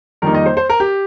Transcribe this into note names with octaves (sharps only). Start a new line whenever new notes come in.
F2 D#3 G3 A#3 D#4 A#4
D#5
C5
C5
A#4
G4